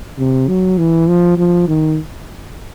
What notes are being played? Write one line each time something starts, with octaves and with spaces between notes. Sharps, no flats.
C3
F#3
E3
F3
F3
D#3